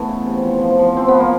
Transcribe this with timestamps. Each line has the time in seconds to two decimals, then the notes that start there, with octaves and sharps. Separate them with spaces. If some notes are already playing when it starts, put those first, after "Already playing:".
Already playing: E3 A3 B3
0.08 C#3
0.26 C3
0.43 F3
0.61 F3
0.79 F3
0.96 F3 C4
1.08 B3
1.14 F3
1.20 A#3